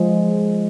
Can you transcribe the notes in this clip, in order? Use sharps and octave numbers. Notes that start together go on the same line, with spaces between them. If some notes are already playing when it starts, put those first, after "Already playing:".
Already playing: F3 G#3